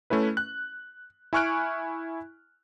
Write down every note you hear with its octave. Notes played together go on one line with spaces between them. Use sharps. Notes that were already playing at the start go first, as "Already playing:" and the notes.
A3 C#4 E4 B4
F#6
E4 G#5 C#6 F6 F#6 D7